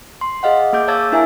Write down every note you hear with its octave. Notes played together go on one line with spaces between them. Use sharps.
C6
G#4 D#5 F5 F#5
A#3 G#4 D6 G6
C#5 F5 A5 E6 G#6 A6
D4 E4 A#4 E5 G#5